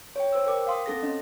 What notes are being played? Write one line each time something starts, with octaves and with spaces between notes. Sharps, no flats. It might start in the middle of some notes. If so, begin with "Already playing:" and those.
C#5 G5
C5 E6
A#4 G5 D6
F5 C6 D#6
C4 A4 A#6
C#4 D#5